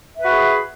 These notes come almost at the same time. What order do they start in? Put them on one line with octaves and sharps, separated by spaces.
E5 B4 F#4 G#4